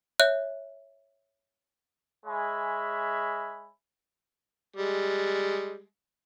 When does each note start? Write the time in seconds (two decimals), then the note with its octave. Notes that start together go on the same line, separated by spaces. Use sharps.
0.20 C#5 E5 F#6
2.26 G#3 C#5 E5 G#5 B5
4.76 G3 G#3